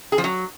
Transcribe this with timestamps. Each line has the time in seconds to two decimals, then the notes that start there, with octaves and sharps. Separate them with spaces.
0.12 G#4
0.18 F3
0.24 F#3